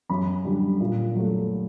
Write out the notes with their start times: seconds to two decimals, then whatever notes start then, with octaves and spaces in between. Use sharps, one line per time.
0.09 F#2 B5
0.45 D3 G3
0.80 A#2
1.15 F#3 A3